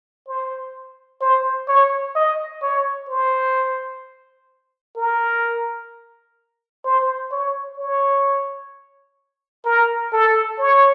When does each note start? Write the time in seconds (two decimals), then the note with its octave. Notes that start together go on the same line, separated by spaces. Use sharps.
0.28 C5
1.21 C5
1.69 C#5
2.16 D#5
2.62 C#5
3.09 C5
4.96 A#4
6.85 C5
7.32 C#5
7.78 C#5
9.65 A#4
10.13 A4
10.59 C#5